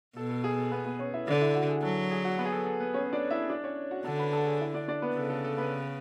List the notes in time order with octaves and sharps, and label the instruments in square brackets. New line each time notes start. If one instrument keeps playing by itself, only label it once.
[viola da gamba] B2 [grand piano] A4
[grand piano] A4
G#4
A4
B3 B4
B3 B4
C#4 C#5
E4 E5
[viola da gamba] D3 [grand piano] D4 D5
[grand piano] E4 E5
F#4 F#5
G#4 G#5
[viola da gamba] F#3 [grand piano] A4 A5
[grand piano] G#4 G#5
F#4 F#5
B3 B4
G#4
A4
A4
B3 B4
C#4 C#5
D4 D5
E4 E5
D4 D5
C#4 C#5
F#4 F#5
[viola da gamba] D3 [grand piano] A4 A5
[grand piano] B4 B5
A4 A5
G#4 G#5
E4 E5
D4 D5
D4 D5
B3 B4
[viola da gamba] C#3 [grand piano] A4
[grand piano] A4
A4
B3 B4